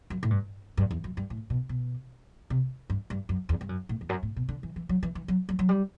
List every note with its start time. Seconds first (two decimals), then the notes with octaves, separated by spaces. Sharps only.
0.10 F#2
0.23 A2
0.31 G2
0.77 G2
0.91 E2
1.04 F#2
1.17 G2
1.30 A2
1.50 B2
1.69 B2
2.50 C3
2.90 G2
3.10 G2
3.29 F#2
3.49 E2
3.61 G2
3.69 F#2
3.89 A2
4.01 E2
4.09 F#2
4.23 A2
4.36 B2
4.49 D3
4.63 E3
4.76 E3
4.89 F#3
5.03 E3
5.15 E3
5.28 F#3
5.49 F#3
5.59 F#3
5.69 G3